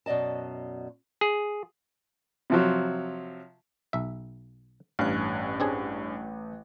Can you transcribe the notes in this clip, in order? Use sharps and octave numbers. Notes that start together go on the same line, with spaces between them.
F#2 B2 D5 D#5 A5
G#4
C3 F3 F#3
B1 E5
A1 G2 C#4 F5 F#6
C4 D4 G#4